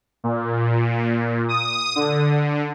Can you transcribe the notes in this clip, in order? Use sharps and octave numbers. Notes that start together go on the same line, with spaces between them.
A#2
D#6
D3